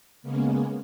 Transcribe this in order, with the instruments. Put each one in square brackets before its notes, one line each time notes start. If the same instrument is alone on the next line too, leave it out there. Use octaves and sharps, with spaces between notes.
[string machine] C#3 G#3 A#3 B3 C#4